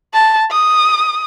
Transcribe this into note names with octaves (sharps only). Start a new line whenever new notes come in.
A5
D#6